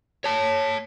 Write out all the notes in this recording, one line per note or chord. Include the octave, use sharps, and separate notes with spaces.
C#5 A5